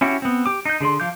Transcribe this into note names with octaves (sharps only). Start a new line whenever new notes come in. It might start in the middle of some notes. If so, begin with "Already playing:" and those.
C#4 E4 F#4 G4
B3 C4
G4 D6
D#4 G6
D3 G#4 D5 C6
F3 F5 D6 G6